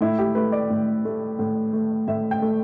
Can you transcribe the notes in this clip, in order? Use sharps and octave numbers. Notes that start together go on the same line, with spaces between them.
A2 E4
G4
A3 B4
D5
A2
A3
A2
A3
A2 E5
G5
A3